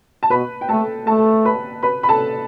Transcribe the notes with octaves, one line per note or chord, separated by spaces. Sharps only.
A5
B2 B4 B5
G5
A3 A4 A5
A3 A4 A5
B4 B5
B4 B5
B5
A4 A5